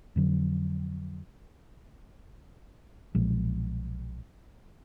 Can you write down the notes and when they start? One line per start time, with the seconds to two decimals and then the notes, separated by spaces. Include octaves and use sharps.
0.16 F2 D3 F#3
3.15 B1 A#2 F3 G#3